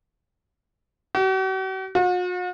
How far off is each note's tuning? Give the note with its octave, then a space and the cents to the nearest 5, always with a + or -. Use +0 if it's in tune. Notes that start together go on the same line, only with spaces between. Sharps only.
F#4 +45
F#4 -45